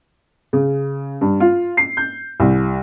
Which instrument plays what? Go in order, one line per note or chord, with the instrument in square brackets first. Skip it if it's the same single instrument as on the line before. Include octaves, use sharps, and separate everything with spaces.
[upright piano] C#3
G2
F4
C7
G6
C2